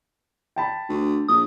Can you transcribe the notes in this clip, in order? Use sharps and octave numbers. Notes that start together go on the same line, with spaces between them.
G5 A5 B5
D2
A#1 D#6